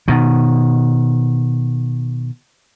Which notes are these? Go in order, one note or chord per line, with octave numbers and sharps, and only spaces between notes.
B2 D#3